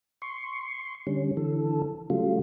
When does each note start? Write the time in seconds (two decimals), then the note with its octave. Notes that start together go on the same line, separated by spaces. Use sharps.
0.22 C6 C#6
1.07 D3 G3 C#4
1.37 D3 E3 A4
2.10 C#3 F#3 G3 A3 F4